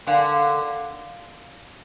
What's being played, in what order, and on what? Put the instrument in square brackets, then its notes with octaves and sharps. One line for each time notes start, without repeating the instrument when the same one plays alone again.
[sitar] D3 [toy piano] A#4 F5 G#5 C6